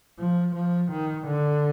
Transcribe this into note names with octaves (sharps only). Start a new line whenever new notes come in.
F3
F3
D#3
D3